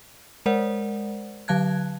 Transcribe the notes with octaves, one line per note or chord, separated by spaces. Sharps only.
G#3 A#4 C5 D5 F#5
D3 F#3 F5 A5 F#6 G#6